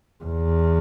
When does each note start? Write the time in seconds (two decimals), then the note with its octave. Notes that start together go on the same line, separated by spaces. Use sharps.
0.24 E2